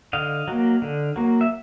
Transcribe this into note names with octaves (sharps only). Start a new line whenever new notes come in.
D3 D#5 F5
F#3 A#3
D3
F#3 A#3
E5